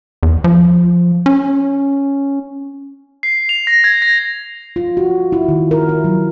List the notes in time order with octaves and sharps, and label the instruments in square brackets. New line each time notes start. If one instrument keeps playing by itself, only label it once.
[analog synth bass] E2
F3
C#4
[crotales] C7
F7
A#6
G#6
A#6
[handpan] F4
F#4
E4
D#3
A#4
E4
F#3